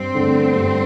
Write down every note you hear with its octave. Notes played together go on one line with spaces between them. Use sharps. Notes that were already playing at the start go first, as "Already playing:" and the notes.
Already playing: G2 C4
D3 A3
G2